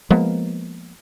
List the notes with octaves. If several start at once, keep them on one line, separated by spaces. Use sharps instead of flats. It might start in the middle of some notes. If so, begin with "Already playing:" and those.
F3 G#3 A#3 B3